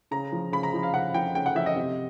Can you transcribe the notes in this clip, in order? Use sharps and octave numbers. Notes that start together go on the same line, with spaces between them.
C#3 A#5
F3
C#3 B5
A#5
F3
F5
C#3 F#5
F3 G5
C#3 G5
F#5
F3 E5
D#5
C3